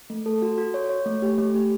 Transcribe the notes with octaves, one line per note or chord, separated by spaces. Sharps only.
A3
A4
F#4
F#4
C#5
C#5
A3
G4
A3
G4